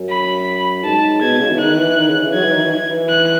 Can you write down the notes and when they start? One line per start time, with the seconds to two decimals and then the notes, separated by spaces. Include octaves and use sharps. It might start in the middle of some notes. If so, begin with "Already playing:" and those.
Already playing: F#2
0.09 B5
0.84 G#2 A5
1.21 B2 G#6
1.40 C#3
1.50 E3
1.58 D#3 F#6
1.77 E3
1.97 D#3
2.09 C#3
2.22 E3
2.34 F#3 G#6
2.43 E3
2.53 D#3
2.62 E3
2.90 E3
3.09 F#6